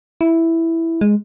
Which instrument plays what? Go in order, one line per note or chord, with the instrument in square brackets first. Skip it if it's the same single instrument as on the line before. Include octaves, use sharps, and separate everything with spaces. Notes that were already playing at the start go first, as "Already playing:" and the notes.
[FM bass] E4
G#3